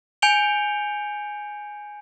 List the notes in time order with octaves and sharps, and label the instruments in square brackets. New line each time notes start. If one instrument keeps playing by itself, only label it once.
[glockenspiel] G#5 G6 C#7 D7 F7 G7